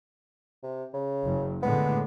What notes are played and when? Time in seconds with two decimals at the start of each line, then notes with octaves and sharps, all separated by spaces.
0.63 C3
0.93 C#3
1.25 F#1
1.62 A2 D3 G#3 B3